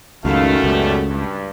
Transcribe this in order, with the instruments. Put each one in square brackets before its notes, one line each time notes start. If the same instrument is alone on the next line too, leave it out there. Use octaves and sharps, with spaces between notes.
[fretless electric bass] C#2 [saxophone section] F#2 [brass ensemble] D#3 E4 F5 [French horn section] A3
[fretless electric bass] C#2 [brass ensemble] B2 G3
[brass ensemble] G2